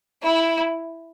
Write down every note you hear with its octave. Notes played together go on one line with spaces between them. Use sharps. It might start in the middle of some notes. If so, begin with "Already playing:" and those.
E4